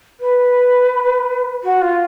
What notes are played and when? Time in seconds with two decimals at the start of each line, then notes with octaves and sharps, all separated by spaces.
0.20 B4
1.64 F#4
1.82 F4